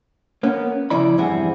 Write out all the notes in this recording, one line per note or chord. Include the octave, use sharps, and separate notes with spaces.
A#3 B3 C#4
C#3 F3 E4 D5 B5
E2 G2 C4 E4 G#4 F#5